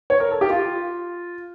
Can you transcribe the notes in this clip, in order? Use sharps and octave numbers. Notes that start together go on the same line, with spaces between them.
C#5
A#4
A4
G4
F4